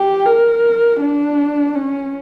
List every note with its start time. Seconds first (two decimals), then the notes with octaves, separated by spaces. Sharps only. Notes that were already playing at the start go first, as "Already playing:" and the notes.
Already playing: G4
0.25 A#4
1.01 D4
1.75 C#4